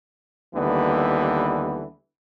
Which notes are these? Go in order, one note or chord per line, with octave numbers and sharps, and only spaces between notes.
D#2 D3 E3 G3 B3